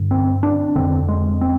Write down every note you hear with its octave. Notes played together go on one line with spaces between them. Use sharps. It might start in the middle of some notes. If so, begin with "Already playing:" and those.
Already playing: G2 D3
C4
D4
F2 D3 C4
G#3
C4